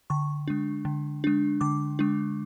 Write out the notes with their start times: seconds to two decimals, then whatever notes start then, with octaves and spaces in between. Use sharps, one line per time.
0.10 D3 C#6
0.48 G#3 D4
0.85 D3
1.24 G#3 D4
1.61 D3 D6
1.99 G#3 D4